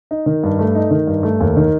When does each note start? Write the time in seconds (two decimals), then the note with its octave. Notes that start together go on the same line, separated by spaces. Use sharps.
0.11 D#4
0.26 D#3
0.43 G2
0.59 A3
0.75 D#4
0.91 D#3
1.07 G2
1.23 A3
1.40 D#2
1.57 D#3